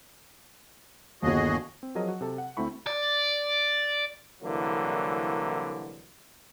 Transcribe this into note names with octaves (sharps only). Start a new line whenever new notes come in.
G1 D#2 F#4 G#4 D#5
C4
F3 F#3 G#4 A#4 D#5
F#4
C3 A4 A5
F#5
D2 A3 C4 E4 B5 C#6
D5
C2 D3 E3 F#3 A#3